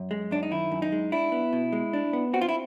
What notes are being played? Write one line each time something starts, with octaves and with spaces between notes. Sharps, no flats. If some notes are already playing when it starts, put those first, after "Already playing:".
Already playing: F#2
G#3
F#2 D4
D#4
D#3 E4
F#2
D#4
G#3
D4 E4
B3
B2
G#3
D4
B3
C4 F#4
F4
E4